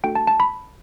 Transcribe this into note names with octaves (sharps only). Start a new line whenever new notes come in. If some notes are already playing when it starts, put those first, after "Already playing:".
A3 D4 F#4 A4 G5
A5
A5
B5